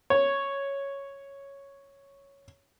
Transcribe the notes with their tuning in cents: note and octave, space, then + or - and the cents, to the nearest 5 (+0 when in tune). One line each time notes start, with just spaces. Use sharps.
C#5 +0